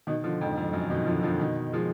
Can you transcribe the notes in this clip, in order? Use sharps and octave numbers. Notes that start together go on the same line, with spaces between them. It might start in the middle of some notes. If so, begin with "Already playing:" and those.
B2 D#3
D3 F3
F2 G#2
F2
F#2
B2 D#3
D3 F3
D3 F3
B2 D#3
F3 G#3